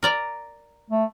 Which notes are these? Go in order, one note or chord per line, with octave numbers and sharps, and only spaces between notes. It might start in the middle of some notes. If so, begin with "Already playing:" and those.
A#4 D5 A#5
A3